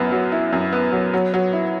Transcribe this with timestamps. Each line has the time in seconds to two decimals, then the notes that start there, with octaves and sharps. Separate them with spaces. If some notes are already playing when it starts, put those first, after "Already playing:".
Already playing: F#2 B3 E4
0.12 F#3
0.32 E4
0.53 F#2
0.73 B3
0.92 F#3
1.13 F#3
1.34 F#3
1.53 E4